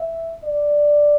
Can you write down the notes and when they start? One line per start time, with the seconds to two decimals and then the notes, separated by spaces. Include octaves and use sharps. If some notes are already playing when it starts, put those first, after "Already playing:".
Already playing: E5
0.43 D5